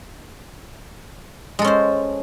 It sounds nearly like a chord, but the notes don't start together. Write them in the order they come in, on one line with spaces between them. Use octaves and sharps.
G#3 A4 C#4 C5